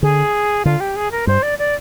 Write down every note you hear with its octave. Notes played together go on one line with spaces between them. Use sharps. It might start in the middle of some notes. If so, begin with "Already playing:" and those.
D3 G#4
D3 F4
G4
G#4
A#4
G2 C5
D5
D5